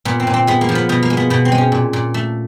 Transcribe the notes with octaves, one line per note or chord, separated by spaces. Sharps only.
A#2 B3
C4
A#2
C4
G#3 B3
A#3
F3
B3
B2 B3
A#3
G#3
B3
B2 B3
C4
G#3
C#4
A#2
A#2
A3